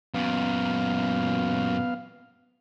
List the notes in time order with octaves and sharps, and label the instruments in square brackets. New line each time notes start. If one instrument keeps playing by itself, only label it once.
[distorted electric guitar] F#2 A#2 [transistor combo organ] B3 F5